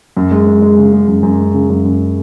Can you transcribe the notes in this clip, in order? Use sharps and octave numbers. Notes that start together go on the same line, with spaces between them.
F#2
G#3
G#3
G#3
C#3
G#3
F#2
F#2
G#3
C#3
F#2
F#2